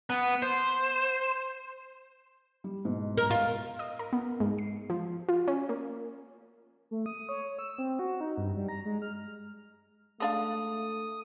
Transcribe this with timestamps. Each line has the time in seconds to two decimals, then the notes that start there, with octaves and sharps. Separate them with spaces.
0.10 B3
0.42 C5
2.64 G3
2.85 G#2 B2
3.17 A#4
3.30 F4
3.79 D#5
3.99 A#4
4.13 B3
4.40 G#2
4.59 C7
4.90 F3
5.29 F4
5.48 C#4
5.69 A#3
6.91 A3
7.06 D#6
7.29 C#5
7.59 E6
7.78 C4
7.99 F#4
8.21 D#4
8.38 G2
8.57 G3
8.69 A#5
8.85 G#3
9.02 F6
10.20 G#3 A3 D4 F5 D#6